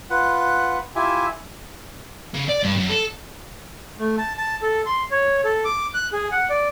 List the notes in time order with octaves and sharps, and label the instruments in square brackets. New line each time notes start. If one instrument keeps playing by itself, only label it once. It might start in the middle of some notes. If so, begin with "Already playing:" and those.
[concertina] F4 B4 F#5
E4 F4 G4 E5 G#5
[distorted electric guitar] C#3
D5
G2
F#2
A4
[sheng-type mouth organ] A3
A5
A5
A4
C6
C#5
A4
D6
F#6
G#4
F#5
D5